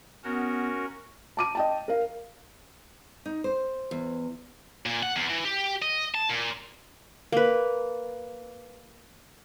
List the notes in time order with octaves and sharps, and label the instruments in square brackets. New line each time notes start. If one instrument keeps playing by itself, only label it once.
[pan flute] B3 [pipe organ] C#4 F#4 A#4
[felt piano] A5 D6 D#7
D#5 G5 A5
A#4 F5
[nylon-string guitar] D#4
C5
[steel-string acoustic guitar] E2
[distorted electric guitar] A#2
F#5
E2
E3
G4
D#5
A5
A#2
[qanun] A#3 B4